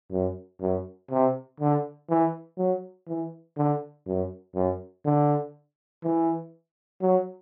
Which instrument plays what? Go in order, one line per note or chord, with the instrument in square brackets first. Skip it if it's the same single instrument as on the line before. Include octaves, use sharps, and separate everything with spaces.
[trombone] F#2
F#2
C3
D3
E3
F#3
E3
D3
F#2
F#2
D3
E3
F#3